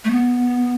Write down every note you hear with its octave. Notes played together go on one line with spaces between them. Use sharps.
A3
B3